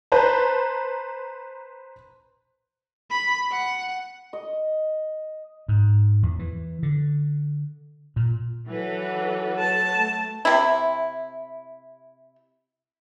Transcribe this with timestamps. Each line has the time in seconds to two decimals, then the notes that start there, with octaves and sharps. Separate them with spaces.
0.12 B4 C5 A5 A#5
3.11 B5
3.52 F#5
4.33 D#5
5.68 G#2
6.23 E2
6.39 E3
6.83 D3
8.16 A#2
8.68 E3 F#3 A4 B4 F#5
9.59 A4 B4 C#5 A5
9.96 A3
10.45 C3 E4